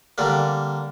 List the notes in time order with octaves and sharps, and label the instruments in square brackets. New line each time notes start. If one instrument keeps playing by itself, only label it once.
[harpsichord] D3 G3 A#3